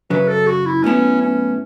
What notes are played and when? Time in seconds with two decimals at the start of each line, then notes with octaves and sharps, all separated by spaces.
0.10 F#2 C#3 F#3 B4
0.28 A4
0.47 F#4
0.66 E4
0.83 A2 F#3 B3 C#4 E4
1.21 C#4